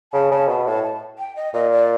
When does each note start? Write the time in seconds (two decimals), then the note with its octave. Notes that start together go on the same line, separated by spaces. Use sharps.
0.13 C#3 A5
0.31 C#3 A5
0.48 B2 A5
0.66 A2 A5
0.83 A5
1.19 G5
1.36 D#5
1.54 A#2 D#5
1.72 D5